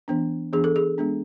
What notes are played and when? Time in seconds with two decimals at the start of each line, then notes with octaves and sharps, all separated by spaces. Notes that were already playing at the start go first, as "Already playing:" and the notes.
0.08 E3 B3 D4
0.53 E3 B3 D4 G#4
0.64 A4
0.76 G#4
0.98 G#3 B3 D4